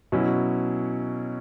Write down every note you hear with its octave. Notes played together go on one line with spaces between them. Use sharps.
B2 F#3 C#4 E4